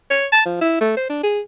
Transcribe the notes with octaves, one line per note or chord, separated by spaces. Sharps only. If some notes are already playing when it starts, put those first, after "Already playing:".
C#5
A5
F3
E4
A3
C5
D4
G#4